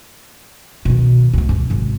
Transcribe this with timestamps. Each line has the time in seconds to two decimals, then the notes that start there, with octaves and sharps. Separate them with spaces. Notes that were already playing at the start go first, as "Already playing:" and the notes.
0.85 B2 D#3
1.33 D2 B2
1.49 G2
1.70 G#1 C3